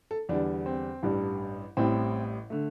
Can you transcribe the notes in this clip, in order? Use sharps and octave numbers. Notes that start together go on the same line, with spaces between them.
A4
E2 D3 G3 D4
C4
A1 G2 G3
A1 A2 G3 C4
D3 A3